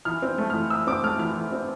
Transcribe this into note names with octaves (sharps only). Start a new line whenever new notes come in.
E3 F6
C4
A3
E3 F6
E3 E6
C4 D6
A3 F6
E3 F6
E3
C4